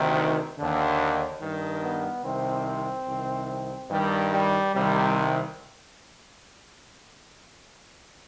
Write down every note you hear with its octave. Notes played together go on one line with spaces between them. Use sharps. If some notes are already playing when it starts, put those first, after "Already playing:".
Already playing: D2 C3 D#3
D#2 D3
G2 D#3
B3
C2 C3 D#3 C4
C2 C3 D#3
G2 D#3 G3
G3
C2 C3 D#3 G3